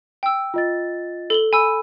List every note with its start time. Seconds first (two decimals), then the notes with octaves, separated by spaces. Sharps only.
0.23 G5 E6
0.54 F4 D#5 A6
1.30 A4 F#7 G7
1.53 G#5 B5 E6